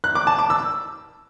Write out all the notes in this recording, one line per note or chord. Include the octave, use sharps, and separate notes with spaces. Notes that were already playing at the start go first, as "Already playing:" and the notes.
F#6
D6
A5
D6
E6